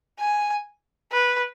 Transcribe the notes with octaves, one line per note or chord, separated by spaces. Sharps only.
G#5
B4